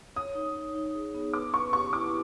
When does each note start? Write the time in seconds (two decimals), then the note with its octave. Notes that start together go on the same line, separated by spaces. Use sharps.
0.16 C#5 D#6
0.35 D#4
0.56 D#4
0.75 D#4
0.95 G#4
1.14 B3
1.33 B4 D6
1.54 B4 C#6
1.73 G4 C#6
1.93 E4 D6